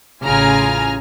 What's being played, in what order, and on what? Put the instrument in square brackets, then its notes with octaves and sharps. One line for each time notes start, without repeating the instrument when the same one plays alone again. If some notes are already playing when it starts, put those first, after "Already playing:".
[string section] A1 C#3 F4 G#5 A#5 F6